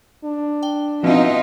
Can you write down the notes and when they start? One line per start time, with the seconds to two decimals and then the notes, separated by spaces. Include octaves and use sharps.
0.24 D4
0.63 G5 G7
1.03 B2 F3 C4 D#4 F4 E5